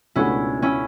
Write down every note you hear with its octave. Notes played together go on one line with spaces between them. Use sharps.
C#2 B2 A3 C#4 D4 E4 F#4
C#4 E4